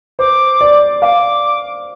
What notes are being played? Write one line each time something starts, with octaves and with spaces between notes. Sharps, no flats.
C5 D6
D5
F5 D6